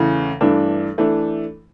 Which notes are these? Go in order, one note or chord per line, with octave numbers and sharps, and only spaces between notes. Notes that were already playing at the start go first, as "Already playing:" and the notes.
Already playing: E2 C#3 E3 A3
G2 E3 A3 D4
E3 A3 D4